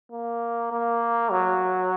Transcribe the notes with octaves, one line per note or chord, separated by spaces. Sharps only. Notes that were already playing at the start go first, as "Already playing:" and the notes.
A#3
A#3
F#3